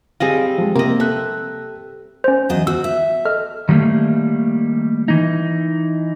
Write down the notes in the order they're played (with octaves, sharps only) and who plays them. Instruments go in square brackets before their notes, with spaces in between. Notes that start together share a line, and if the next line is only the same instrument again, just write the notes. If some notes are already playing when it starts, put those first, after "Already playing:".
[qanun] G3 C4 D#5 [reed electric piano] G#4 F5
[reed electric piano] F3 G#3
[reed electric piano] C3 A#3 A#4 [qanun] C4 D#5
[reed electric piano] A4 F#6 [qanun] E5
[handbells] C#4 C5
[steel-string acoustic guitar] E2 F#3 D#5
[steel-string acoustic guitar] F#4 [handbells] E6
[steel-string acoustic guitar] E5
[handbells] A4 D#5 F6
[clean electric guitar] D#3 F3 G3 A3 A#3
E3 D#4